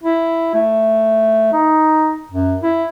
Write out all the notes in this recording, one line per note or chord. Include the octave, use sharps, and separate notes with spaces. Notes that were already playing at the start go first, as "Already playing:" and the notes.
E4
A3
D#4
F#2
E4